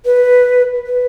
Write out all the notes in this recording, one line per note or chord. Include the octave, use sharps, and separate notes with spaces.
B4
B4